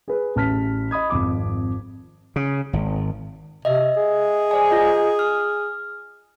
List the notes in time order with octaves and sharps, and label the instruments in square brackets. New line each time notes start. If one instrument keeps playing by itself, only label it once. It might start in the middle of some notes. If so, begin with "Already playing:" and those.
[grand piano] G#4 B4
A1 A5 F6 B6
D#5 B5 D#6 G#6
G#1 F2 D6
[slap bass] C#3
G#1
[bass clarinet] C3 [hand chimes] D#5 E5
[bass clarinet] G#4
[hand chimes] C5 D5 G#5
F4 D#5
F6